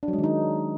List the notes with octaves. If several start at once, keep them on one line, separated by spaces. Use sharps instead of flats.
D4
F#3
G#3
D#3
D#4